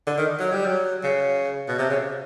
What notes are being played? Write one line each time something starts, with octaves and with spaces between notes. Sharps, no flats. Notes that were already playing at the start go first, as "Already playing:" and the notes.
D3
D#3
F#3
G3
F#3
C#3
B2
C3
C#3